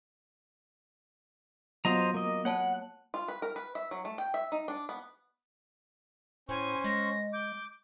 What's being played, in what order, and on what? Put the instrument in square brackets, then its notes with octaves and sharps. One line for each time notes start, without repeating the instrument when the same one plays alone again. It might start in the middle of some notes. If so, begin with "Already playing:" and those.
[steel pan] F#3 B3 F4 [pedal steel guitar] C5 D#5 A#5
[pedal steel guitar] A#3 D#5
[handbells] A#3 C#5 A5 [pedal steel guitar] F#5
[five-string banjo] F4
B4
A#4
B4
E5
F#3
A3
G5
E5
D#4
D4
B3
[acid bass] A2 [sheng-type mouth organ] C#4 C5 C#6 [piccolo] G#5
[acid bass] G#3 [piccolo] A#6
[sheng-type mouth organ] D6 [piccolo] G6